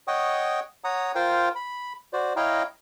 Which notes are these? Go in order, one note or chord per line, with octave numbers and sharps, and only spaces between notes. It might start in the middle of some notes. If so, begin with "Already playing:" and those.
C#5 D#5 F#5 G5 C#6 D#6
C#5 F#5 A#5 D#6
F4 A#4 C5 F5 G5
B5
F#4 C5 D5
E4 C#5 D#5 F5 G5 A#5